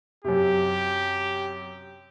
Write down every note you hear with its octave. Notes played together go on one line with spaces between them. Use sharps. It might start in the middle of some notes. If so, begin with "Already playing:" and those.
F#2 C3 G4